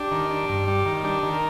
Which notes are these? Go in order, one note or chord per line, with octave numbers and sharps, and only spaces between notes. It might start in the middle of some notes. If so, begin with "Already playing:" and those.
Already playing: D4 G4
D#3
D4
G2
G3
D#3
D4 G4
D#3
A#4